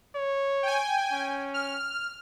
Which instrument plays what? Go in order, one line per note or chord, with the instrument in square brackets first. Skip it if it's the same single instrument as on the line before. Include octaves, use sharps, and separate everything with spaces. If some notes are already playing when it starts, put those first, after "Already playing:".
[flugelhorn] C#5
[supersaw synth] G5 G#5
[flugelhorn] C#4
[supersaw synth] F6